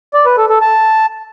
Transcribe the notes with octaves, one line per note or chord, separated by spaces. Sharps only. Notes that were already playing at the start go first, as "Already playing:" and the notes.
D5
B4
A4
A4
A5